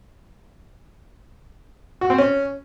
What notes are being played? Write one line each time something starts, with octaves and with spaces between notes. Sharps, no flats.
F#4
C4
C#4